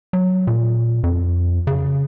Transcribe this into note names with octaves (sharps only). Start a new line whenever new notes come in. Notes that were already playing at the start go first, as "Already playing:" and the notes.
F#3
A#2
F2
C#3